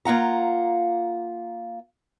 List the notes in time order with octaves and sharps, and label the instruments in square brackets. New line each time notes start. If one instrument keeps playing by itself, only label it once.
[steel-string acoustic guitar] A#3 F4 F#5 A#5